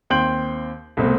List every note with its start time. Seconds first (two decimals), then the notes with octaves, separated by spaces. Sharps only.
0.10 D#2 C4 G5 C6 G6 F#7
0.97 C2 B2 A3 C4